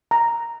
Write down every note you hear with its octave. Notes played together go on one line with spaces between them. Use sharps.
A#5